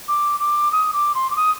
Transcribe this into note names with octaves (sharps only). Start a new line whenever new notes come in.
D6
D6
D#6
D6
C6
D6
D#6